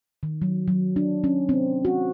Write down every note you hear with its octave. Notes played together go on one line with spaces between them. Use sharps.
D#3
F#3
F#3
D4
C#4
C4
F#4